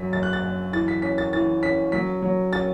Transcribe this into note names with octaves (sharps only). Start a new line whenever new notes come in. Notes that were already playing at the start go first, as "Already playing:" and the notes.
Already playing: F#2 F#3 B6
F#2 A6
F#6
A6
F#2
E3 A6
B6
C#4 B6
A6
E3 A6
C#4 B6
F#3 B6
F#3
C#4 A6